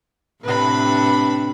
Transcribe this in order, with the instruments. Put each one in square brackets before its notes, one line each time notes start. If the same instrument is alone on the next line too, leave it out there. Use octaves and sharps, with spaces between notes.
[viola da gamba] A2 C3 D4 [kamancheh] B4 B5